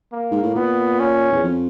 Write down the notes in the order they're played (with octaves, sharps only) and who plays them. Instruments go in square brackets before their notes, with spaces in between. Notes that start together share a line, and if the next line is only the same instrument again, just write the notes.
[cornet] A#3
[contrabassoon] G#2
A2
[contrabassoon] A#2 [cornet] B3
[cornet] C#4
[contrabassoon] E2
F2